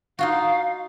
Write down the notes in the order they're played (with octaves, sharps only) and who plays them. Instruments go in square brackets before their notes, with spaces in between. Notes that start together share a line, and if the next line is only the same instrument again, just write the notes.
[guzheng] D#4 F4 F#4 [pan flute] F5